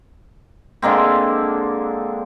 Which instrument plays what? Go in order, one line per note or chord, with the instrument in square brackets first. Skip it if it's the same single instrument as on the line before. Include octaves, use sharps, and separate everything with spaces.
[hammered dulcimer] D3 G#3 A#3 C4